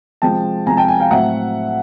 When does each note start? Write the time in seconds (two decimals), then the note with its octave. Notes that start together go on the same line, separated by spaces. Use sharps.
0.22 C3 F3 G#3 G5 A5
0.66 C3 F3 G#3 G#5 A#5
0.77 G5 A5
0.88 G#5
1.00 F5 G5
1.11 A2 F#3 A3 C4 E5 F#5